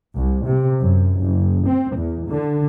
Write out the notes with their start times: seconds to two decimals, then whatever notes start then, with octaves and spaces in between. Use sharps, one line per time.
0.15 C2
0.46 C3
0.81 F#2
1.19 F#1
1.67 C4
1.96 E2
2.28 D3